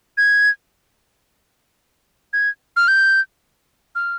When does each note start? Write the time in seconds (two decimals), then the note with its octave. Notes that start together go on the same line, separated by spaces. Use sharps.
0.18 G#6
2.33 G#6
2.77 F6
2.88 G6
3.95 F6